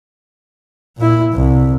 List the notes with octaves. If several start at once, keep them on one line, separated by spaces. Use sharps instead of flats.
A#2 E4
C2